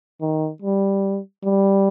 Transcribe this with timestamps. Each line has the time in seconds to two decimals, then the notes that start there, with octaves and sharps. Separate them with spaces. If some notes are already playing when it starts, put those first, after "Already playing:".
0.21 D#3
0.62 G3
1.44 G3